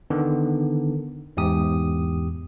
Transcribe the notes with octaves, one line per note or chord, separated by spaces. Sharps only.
D3 D#3 B3
E2 G#2 G4 D#6